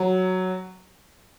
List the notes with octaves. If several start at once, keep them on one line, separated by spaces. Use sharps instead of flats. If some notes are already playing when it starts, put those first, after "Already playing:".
Already playing: F#3